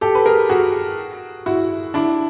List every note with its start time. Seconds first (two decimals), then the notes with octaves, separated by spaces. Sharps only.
0.01 G4 A4
0.15 B4
0.26 G#4 A#4
0.49 F#4 G#4
1.46 E4 F#4
1.94 D4 E4